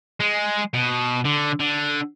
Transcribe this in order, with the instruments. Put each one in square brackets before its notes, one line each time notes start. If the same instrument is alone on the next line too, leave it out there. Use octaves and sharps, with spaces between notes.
[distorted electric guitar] G#3
B2
D3
D3